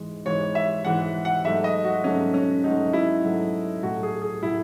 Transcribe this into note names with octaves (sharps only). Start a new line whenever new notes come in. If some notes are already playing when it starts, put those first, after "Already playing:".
Already playing: G#2 E3 G#3
G#2 E3 G#3 C#5
E5
G#2 E3 G#3 F#5
F#5
G#2 F#3 A3 E5
D#5
F#4
G#2 F#3 A3 C#4
C#4
G#2 F#3 A3 D#4
E4
G#2 F#3 A3
A2 F#3 A3 F#4
G#4
G#4
A2 F#3 A3 E4